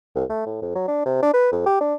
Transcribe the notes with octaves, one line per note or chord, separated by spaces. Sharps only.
C2
A3
A2
F2
F#3
D4
C3
D4
B4
F2
G4
D4